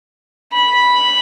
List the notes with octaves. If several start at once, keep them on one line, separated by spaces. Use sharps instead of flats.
B5